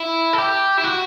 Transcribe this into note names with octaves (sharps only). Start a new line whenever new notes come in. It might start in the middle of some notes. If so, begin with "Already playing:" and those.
Already playing: E4
A4
G4
E4
F#4